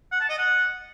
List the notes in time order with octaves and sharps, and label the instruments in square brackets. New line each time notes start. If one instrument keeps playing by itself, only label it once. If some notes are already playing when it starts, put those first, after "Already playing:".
[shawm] F#5
A5
D#5
F#5